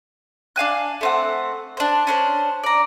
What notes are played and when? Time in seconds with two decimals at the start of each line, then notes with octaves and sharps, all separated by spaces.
0.56 D4 F5 G#5 F#6
1.01 A3 C4 F#5
1.77 D4 C5
2.07 C#4 D4 C5
2.64 D5 A#5